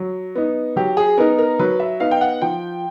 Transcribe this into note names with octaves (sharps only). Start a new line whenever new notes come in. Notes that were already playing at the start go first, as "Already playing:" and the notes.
Already playing: F#3
B3 D#4
F#3 G4
G#4
B3 D#4 A#4
A#4
F#3 B4
E5
B3 D#4 F5
G5
F#5
F3 G5